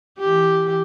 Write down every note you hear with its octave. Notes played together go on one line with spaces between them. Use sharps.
E3 G4